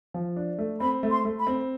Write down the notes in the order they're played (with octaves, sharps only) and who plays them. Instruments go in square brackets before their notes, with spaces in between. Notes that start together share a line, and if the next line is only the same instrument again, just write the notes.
[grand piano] F3
D4
A3
[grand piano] C4 [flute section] B5
[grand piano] A3
[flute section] C6
[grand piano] A3
[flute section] B5
[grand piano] C4